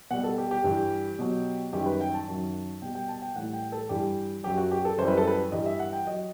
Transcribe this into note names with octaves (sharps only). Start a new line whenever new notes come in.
B2 G3 F#5
A4
G4
G4
G2 E3 G3
B2 F#3
F#2 D#3 G3 G4
B4
G5
A5
F#2 D#3 F#3
B2 G3 G5
G5
A5
G5
A2 E3 G3 F#5
G5
A4
G2 E3 G3 G4
F#2 F#3 G4
F#4
G4
A4
F#2 E3 G3 C5
B4
A4
B4
G2 E3 G3 D#5
E5
F#5
G5
F#3 D#5